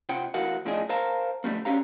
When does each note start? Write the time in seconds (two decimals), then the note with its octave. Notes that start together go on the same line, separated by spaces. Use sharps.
0.09 C3 F4 F#5 G5
0.34 D2 E3 F#4 A#4 F5 F#5
0.65 B1 A2 F3 D4 G#4 D#5
0.89 A#4 C5 F5 A5 A#5
1.44 D3 F3 G3 A3 A#3
1.65 D3 C#4 G4 F5 A#5